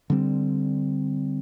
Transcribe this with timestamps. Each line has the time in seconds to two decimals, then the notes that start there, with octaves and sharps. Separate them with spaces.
0.10 D3 G3 C4